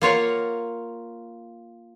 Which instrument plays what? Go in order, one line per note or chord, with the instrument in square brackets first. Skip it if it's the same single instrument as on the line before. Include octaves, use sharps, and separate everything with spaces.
[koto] A#3 F4 C#5 F#5